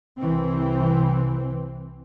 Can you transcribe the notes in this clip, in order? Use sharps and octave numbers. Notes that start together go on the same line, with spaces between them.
C2 E3 C4